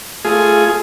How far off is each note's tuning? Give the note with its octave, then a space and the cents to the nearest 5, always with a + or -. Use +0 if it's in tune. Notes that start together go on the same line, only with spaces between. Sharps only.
A3 +0 F4 -10 G#4 +5